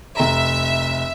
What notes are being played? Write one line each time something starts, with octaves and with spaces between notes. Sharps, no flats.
F1 E5 A#5